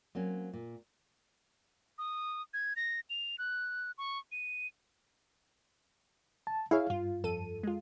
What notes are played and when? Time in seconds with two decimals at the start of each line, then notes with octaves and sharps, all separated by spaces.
0.15 F#3 A#3 C4 C#4
0.53 A#2
1.98 D#6
2.54 G#6
2.76 A#6
3.10 F7
3.38 F#6
3.98 C#6
4.32 D#7
6.47 A5
6.71 E4 G#4 C#5 F5
6.90 G2 F4
7.24 F2 A4 D#7
7.63 G#3 F4